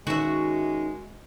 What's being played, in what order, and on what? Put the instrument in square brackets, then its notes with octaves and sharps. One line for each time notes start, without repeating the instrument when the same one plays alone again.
[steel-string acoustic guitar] D#3 C#4 [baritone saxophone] G#3 [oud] F#4 E5